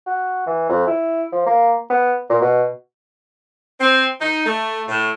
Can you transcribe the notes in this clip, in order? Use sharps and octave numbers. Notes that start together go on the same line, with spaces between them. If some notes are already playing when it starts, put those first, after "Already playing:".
F#4
E3
F2
E4
F3
A#3
B3
A#2
B2
C4
D#4
A3
A2